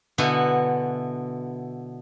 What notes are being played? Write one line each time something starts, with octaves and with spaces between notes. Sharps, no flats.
B2 D3 B3 E4 F#4 G#5